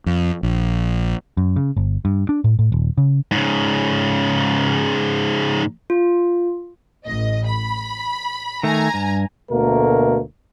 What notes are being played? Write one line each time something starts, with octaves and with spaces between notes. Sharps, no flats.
F2
A#1
F#2
C#3
G1
G2
D4
A2
A2
D#1
C#3
G#2 C#3
F4
A1 D#5
B5
D#3 A3 G#5 A#5
G2
D2 B2 A3 A#3 A#4